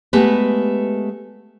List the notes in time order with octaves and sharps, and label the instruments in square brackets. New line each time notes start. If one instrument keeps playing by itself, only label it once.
[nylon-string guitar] G#3 A3 B3 G4 B4